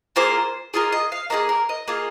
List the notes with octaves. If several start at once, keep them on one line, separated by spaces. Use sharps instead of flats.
A#3 F4 G#4 C5
A#3 F4 G#4 D#5
D#5
F5
A#3 F4 G#4 D#5
A#4
D#5
A#3 F4 G#4